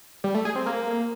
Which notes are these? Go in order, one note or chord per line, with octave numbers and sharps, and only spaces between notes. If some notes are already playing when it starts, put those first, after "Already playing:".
G3
A3
G#4
C4
A#3